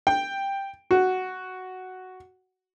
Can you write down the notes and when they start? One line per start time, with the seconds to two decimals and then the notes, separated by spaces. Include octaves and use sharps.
0.07 G5
0.91 F#4